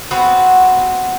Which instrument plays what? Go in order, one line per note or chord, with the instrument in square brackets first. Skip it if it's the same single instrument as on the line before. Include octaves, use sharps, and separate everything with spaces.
[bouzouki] B3 C4 F#4 F#5